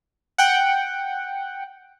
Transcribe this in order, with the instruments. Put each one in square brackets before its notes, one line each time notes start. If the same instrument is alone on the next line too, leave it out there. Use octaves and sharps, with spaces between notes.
[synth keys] F#5 G5